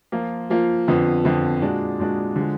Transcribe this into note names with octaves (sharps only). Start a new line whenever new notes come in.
F3 A#3 F4
F3 A#3 F4
F2 D3 F3 B3
F2 D3 F3 B3
A#2 G#3 D4 F#4
A#2 G#3 D4 F#4
D3 F3 G#3